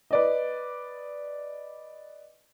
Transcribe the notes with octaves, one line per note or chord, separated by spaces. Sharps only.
B4 D5 D#5